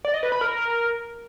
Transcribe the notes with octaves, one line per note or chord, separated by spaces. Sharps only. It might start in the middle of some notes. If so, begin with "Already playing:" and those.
D5
D#5
B4
B5
A#4